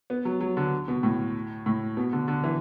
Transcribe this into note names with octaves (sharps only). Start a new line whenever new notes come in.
B3
F#3
F#3
D3
B2
A2
A2
B2
D3
D3
E3